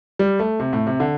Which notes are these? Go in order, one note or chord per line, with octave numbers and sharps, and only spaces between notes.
G3
A3
C3
A2
C3
D3